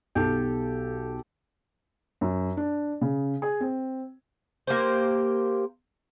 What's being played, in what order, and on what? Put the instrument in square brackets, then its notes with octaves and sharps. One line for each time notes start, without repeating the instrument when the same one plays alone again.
[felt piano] B1 [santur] G4 A4
[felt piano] F#2
D4
C#3
G#4
C4
[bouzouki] A#3 G4 C5